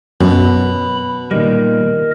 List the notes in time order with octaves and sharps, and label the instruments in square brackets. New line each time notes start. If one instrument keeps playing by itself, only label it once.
[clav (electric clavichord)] F#2 [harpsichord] B2 [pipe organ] B5
[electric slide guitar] A#2 D#3 G3 [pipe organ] A#4 D#5